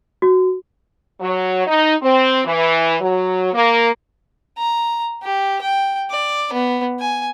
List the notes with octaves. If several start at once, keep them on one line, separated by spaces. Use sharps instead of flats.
F#4
F#3
D#4
C4
E3
F#3
A#3
A#5
G4
G5
D5
B3
G#5